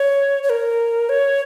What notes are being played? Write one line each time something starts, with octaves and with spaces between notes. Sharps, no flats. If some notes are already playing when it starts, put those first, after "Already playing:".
Already playing: C#5
C#5
A#4
C#5